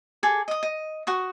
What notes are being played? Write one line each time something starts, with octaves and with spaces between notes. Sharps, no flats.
G#4 A4 D6
D#5 D#6
D#5
F#4 C#6 D#6